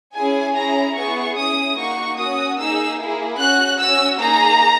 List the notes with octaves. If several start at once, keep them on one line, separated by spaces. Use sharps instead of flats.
C#4 E4 G#4 G#5
C#4 E4 G#4 A#5
B3 E4 G#4 C#6
C#4 E4 G#4 D#6
A#3 D#4 F#4 C#6
C#4 F#4 D#6
A#3 D#4 G#4 E6
A#3 E4 G#4
C#4 F#4 F#6
C#4 F#4 E6
A#3 D#4 G#4 A#5